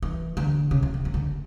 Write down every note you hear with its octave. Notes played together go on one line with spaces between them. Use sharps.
E3
D3
C#3
E3
D#3
D#3
D3